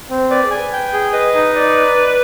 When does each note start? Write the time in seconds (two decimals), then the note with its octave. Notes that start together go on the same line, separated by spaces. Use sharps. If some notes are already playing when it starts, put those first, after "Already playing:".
0.10 C4
0.30 B4 D5
0.44 G#4
0.51 G#5
0.57 B4
0.73 G5
0.93 G#4
1.13 B4 D#5
1.34 D#4
1.55 D5